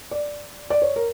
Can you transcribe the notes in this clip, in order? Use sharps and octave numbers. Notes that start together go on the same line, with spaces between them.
D5
D5
C#5
A#4